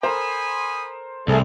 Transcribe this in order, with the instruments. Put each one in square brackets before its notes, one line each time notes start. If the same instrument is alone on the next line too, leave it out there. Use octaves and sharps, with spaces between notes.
[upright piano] A4 A#4 C5 [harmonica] G#5 B5 D#6
[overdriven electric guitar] C2 [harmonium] A3 G#4 A4 [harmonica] C4